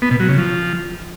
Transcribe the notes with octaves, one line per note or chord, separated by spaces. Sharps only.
B3
B2
F#3
C#3
F3